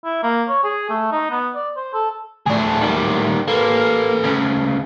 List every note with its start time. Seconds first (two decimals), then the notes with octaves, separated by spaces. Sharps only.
0.04 E4
0.23 A#3
0.49 C#5
0.64 G#4
0.90 A3
1.12 D#4
1.31 B3
1.55 D5
1.77 C5
1.94 A4
2.46 D2 A2 D4 G#4
2.81 D#3 G3
3.48 A#3 A4 B4
4.24 D2 C#3